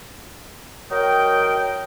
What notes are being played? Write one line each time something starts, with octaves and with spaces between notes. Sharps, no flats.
F#3 A#4 D#5 G5